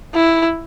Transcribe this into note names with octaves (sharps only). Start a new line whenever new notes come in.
E4